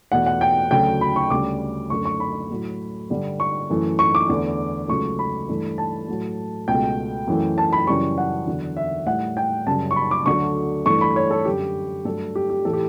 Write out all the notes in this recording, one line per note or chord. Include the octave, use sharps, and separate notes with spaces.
E2 B2 A3 F#5
F#5
G5
D2 C#3 F#3 A3 G5
B5
C#6
D2 C#3 G3 D6
F#2 D3 A3 C#6
C#6
B5
A2 F#3 A3
G2 D3 G3
C#6
F#2 E3 A3
C#6
D6
E2 D3 A3
C#2 C#3 F#3 A3 C#6
B5
G2 E3 A3
A5
A2 F#3 A3
C#2 B2 A3 G5
F#2 E3 A3
A5
B5
F#2 C#3 E3 G3 C#6
F#5
E2 D3 F#3
E5
A2 G3 F#5
G5
F#2 C#3 G3 A5
C#6
B5
D6
D2 D3 F#3 A3 C#6
G2 E3 A3 C#6
B5
C#5
A4
F#2 D3 G3 G4
G2 F#3 A3 A4
G4
G4
A2 E3 A3 A4
G4